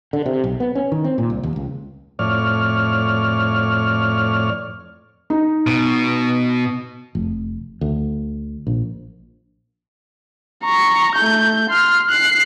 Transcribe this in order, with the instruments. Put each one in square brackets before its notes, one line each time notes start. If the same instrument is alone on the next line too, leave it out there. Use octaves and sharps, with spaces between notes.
[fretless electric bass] D3
C3
B1
B3
C#4
D#3
C4
A#2
C2
D#2
C#2
[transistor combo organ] F2 A2 C#5 D5 F6
[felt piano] D#4
[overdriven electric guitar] B2
[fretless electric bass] F1
D2
A#1
[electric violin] A#5 C#6
A3 G6
C6 F6
F#6 C7